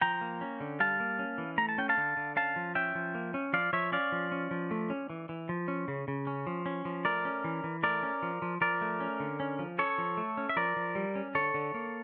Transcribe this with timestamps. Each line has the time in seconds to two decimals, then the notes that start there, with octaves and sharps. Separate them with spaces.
0.01 F3 G5 A#5
0.21 A#3
0.41 C#4
0.60 D3
0.80 G3 F5 A5
1.00 A#3
1.19 C#4
1.38 E3
1.58 A3 A#5
1.69 A5
1.78 C#4 G5
1.89 F5 A5
1.97 D3
2.17 D3
2.36 C#4 F5 A5
2.56 F3
2.75 C#4 E5 G5
2.95 F3
3.15 A#3
3.34 C#4
3.53 F3 D5 F5
3.73 F3 C#5 E5
3.92 C#4 D5 F5
4.12 F3
4.32 C#4
4.51 F3
4.71 A3
4.90 C#4
5.10 E3
5.29 E3
5.49 F3
5.68 C#4
5.88 C#3
6.08 C#3
6.27 C#4
6.47 F3
6.66 C#4
6.85 F3
7.05 A3 A#4 D5
7.25 C#4
7.44 E3
7.64 E3
7.83 A3 A#4 D5
8.03 C#4
8.22 F3
8.42 F3
8.61 F3 A#4 D5
8.81 A3
9.00 C#4
9.20 D3
9.40 C#4
9.59 F3
9.78 C#4 A4 C#5
9.98 F3
10.17 A3
10.37 C#4
10.49 E5
10.56 F3 A#4 D5
10.76 F3
10.95 G3
11.15 C#4
11.35 D3 A4 C#5
11.54 D3
11.74 A#3